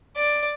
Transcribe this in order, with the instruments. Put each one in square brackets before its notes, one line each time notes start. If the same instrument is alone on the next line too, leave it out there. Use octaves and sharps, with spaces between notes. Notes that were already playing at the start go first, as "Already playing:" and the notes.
[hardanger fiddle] D5